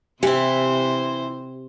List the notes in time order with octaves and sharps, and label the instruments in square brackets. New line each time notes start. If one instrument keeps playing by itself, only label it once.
[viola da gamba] C3 C5 [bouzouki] E3 E4 [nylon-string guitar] G4